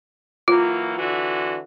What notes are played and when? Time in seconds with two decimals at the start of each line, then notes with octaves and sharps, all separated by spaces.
0.48 E3 F#3 A#3 F4
0.98 D3 E3 F#4